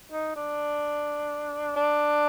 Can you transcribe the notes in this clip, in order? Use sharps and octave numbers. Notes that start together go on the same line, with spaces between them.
D#4
D4
D4